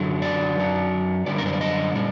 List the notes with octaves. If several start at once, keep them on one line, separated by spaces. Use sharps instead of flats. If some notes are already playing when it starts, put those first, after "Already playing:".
Already playing: F#2 D3 F#3
D5
F#2 F#3
F#2 D3 G3 D5
A#4
C5
D5
D#5
A#2 G3 D5